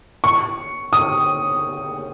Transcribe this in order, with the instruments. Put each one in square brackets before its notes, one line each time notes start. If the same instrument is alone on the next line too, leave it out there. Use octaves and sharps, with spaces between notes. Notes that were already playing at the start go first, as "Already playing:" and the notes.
[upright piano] C#6
D#6